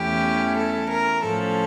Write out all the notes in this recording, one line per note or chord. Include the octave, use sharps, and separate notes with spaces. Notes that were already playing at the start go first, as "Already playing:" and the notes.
Already playing: E2 E3 A3 C#4 E4 G4
A4
A#4
A2 F3 C#4 A4